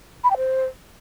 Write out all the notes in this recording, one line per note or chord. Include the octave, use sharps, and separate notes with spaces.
B5
G5
C5